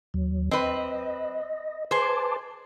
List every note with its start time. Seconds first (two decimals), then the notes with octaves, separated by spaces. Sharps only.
0.14 D#2 F#3
0.51 C4 B4 D#5
1.91 G#4 B4 C5 A5 D6